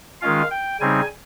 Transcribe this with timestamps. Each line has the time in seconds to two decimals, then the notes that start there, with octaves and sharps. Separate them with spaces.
0.21 D#3 G#3 C#4 F4 F5
0.51 G5
0.80 C#3 G3 C4 D#4 G#5